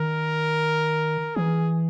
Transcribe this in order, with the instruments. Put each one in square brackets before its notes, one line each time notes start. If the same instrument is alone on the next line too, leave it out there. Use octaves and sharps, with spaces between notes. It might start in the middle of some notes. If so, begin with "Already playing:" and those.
Already playing: [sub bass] D#3 [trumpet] A#4
[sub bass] E3 [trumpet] G#4